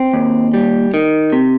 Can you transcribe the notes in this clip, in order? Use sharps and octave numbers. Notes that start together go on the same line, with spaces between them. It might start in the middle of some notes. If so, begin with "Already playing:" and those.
Already playing: C4
D#2
G3
D#3
C3